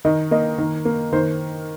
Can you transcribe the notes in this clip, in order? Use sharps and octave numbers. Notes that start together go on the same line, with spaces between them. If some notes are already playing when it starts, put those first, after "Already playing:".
D#3 D#5
A#3 D#5
D#3
A#3
D#3 C5